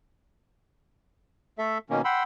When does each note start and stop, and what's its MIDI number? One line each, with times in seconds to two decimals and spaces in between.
1.58 1.78 57
1.58 1.78 69
1.58 1.78 76
1.90 2.02 47
1.90 2.02 51
1.90 2.02 58
1.90 2.02 61
2.05 2.23 78
2.05 2.23 79
2.05 2.23 83
2.05 2.23 84
2.05 2.23 88